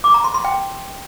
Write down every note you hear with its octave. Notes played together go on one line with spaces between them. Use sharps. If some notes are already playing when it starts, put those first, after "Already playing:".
D6
A#5
C6
C6
G5